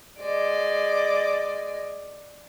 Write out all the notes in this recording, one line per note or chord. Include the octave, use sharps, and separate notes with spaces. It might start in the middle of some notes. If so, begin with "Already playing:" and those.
G#3 D5